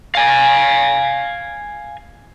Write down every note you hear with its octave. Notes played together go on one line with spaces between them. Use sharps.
F5 G#5